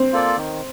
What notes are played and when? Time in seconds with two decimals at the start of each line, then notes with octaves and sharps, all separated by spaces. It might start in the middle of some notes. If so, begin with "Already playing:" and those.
Already playing: C4
0.13 A#3 F4 A4 D5
0.37 D#3